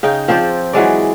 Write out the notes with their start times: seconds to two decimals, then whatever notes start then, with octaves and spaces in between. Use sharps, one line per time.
0.03 C#3 D#4 G5
0.28 F3 C4 C5 D5
0.73 E3 F#3 G#3 D5